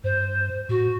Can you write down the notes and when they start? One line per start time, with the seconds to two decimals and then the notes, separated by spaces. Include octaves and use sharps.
0.04 G2 C5
0.69 A2 F#4